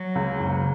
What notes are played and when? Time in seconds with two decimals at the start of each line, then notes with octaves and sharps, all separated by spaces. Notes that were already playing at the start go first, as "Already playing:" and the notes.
Already playing: F#3
0.15 C#2
0.39 F#1